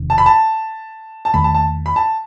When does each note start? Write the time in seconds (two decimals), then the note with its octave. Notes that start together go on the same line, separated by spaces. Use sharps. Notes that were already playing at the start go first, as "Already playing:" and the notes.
Already playing: E1 E2 C3 D#3
0.10 A5
0.18 B5
0.26 A5
1.25 A5
1.34 E2 D#3 A3 B5
1.44 A5
1.54 A5
1.86 B5
1.96 A5